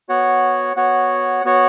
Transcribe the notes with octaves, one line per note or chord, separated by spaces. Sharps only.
B3 F#4 C#5 F#5
B3 F#4 C#5 F#5
B3 F#4 C#5 F#5